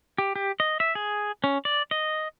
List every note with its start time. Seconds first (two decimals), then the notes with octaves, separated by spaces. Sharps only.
0.18 G4
0.36 G4
0.60 D#5
0.80 E5
0.95 G#4
1.44 C#4
1.65 D5
1.91 D#5